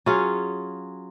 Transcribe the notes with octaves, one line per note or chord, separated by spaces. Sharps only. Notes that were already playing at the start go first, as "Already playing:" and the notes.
F#3 C#4 F4 G#4